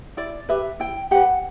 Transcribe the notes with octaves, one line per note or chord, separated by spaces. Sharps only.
E4 D5
G4 B4 E5
E4 G5
G4 B4 F#5